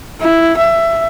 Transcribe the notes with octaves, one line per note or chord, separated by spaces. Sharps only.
E4
E5